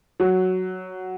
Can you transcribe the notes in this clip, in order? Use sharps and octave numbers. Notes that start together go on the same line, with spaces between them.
F#3